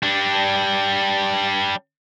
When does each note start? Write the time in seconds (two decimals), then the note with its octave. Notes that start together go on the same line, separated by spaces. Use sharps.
0.03 G3 D4